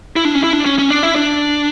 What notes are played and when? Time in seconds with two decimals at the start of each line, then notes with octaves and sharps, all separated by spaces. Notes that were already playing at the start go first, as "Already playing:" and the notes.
0.16 E4
0.25 D4
0.35 C#4
0.44 E4
0.53 D4
0.66 C#4
0.79 C#4
0.90 D4
1.03 E4
1.16 D4